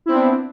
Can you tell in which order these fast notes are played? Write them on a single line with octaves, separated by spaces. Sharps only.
E4 C4 B3 D4